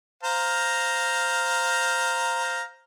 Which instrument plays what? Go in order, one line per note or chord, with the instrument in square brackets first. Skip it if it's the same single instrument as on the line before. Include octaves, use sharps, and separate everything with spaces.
[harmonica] C5 F5 A#5